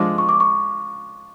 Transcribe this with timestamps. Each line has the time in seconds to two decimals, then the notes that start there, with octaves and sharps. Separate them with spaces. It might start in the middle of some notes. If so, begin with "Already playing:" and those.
Already playing: F3 G#3 D4 F4 D6
0.18 C#6
0.29 D6
0.40 C#6